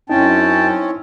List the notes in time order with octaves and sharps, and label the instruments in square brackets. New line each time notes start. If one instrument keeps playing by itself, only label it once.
[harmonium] F#2 G5 A5 [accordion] C4 C#4 [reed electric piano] D#4 E4